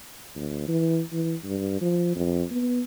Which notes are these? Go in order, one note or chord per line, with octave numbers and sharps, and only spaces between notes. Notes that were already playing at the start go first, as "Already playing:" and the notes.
D2
E3
E3
G2
F3
F2
B3